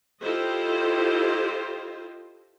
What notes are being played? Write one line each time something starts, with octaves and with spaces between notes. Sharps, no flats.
E4 F4 G4 A4 C5 D#5